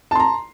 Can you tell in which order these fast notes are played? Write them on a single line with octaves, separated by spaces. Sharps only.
A5 C6 A#5